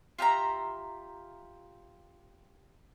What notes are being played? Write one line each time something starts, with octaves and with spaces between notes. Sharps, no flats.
F4 G4 E5 A#5